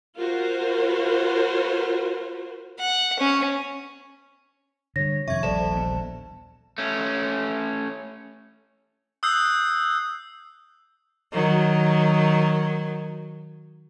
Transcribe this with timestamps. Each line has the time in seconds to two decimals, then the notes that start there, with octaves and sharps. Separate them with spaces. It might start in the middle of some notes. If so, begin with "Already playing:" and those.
0.17 F4 F#4 A#4 C5
2.79 F#5
3.20 C#4
4.96 D3 G3 C#5 A#6
5.28 F2 C3 D#3 E5 C#6 G#6
5.43 D#1 A#1 G3 A4 C5 D5 A5 E7
5.74 E3 B3
6.78 A3 C#4
9.23 D#6 E6 F#6 G6 C7
11.33 D#3 F#3